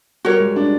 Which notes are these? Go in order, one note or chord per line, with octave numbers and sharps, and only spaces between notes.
G3 F#4 A#4 C#5
G#3
D4